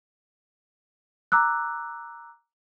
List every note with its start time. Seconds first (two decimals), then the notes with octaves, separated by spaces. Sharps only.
1.32 A#5 D6 E6 F#6